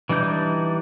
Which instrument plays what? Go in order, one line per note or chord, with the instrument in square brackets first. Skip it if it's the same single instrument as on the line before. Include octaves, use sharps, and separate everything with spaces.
[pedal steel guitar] E3 G3 D4 D#4 G6